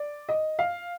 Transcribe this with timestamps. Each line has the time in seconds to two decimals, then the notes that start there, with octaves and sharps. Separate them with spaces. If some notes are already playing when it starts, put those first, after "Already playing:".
Already playing: D5
0.29 D#5
0.59 F5